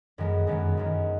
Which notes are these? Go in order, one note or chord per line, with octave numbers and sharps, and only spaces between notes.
F#2 D#3 G#3 B3
F#2 D#3 G#3 B3
F#2 D#3 G#3 B3